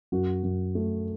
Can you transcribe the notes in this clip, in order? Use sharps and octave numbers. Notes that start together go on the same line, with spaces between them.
F#2 F#4
F#2
A3